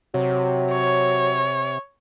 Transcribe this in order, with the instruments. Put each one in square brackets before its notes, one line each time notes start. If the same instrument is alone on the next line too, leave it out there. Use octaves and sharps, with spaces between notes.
[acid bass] C3 [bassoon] F#3
[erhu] C#5